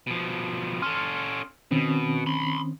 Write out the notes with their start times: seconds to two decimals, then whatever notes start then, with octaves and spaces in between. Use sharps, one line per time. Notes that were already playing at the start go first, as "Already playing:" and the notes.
0.07 B2 F3
0.82 C#4 A4 C6 F6
1.71 B2 D#3 C4 C#4
2.27 B5 C6